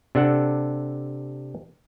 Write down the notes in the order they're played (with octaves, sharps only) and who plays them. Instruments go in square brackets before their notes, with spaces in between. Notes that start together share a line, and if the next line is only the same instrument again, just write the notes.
[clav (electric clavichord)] C3 D4 A4 F#5